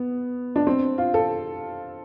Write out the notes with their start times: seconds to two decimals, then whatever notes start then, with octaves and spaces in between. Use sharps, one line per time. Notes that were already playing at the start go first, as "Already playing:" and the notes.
Already playing: B3
0.56 D4
0.67 C4
0.98 F4
1.14 A4